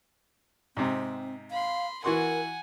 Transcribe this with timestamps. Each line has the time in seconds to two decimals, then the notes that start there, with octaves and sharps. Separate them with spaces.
0.77 G#2 C3 C4
1.51 F5 B5 C6
2.04 E3 F#4 A#4 F#5 G#5 C6